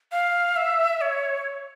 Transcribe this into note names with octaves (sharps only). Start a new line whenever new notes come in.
F5
E5
C#5